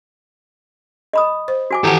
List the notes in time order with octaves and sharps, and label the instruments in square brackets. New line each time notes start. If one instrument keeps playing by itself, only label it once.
[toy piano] D#5 B5 D#6
[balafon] C5
[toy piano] F#4 G#5 D6
[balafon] D#3 E3 F#5 [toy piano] E4 G#5 [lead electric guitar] G4 A4